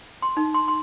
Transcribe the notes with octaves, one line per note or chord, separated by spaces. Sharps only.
C6
D#4
C6
C6